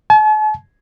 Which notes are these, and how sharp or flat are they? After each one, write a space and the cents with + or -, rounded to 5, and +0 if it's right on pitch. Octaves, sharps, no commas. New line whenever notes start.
A5 -45